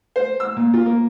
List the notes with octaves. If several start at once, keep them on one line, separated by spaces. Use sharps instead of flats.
C5
E6
A#2
F4
A#3